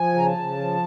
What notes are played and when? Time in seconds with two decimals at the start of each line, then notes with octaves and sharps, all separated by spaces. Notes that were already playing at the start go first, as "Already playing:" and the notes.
Already playing: F3 G#5
0.14 C#3 A#5
0.26 A5
0.37 C#3
0.58 F3